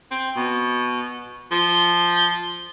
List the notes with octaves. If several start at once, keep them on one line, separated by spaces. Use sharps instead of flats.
C4
B2
F3